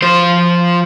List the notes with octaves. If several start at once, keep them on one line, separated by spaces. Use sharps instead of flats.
F3 C5